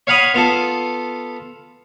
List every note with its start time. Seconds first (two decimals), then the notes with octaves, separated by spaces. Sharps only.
0.07 C#5 F5 F#5 B5 D#6
0.34 B3 F4 A4